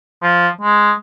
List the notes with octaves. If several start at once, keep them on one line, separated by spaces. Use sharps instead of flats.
F3
G#3